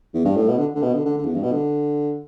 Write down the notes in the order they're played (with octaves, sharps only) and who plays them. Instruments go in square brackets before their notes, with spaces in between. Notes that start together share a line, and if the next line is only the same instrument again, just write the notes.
[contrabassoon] E2
G2
A2
B2
D3
D3
B2
D3
D3
D3
E2
G2
B2
D3